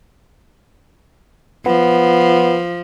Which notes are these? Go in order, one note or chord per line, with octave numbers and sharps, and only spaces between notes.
F3 B3